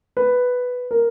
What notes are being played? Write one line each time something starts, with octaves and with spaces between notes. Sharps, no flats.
B4
A#4